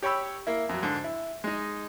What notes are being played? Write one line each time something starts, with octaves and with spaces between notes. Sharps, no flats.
G4 C#5 G5 B5 E6
A#3 E4
F2 F#3
G#2 D3
E4
G#3 D#4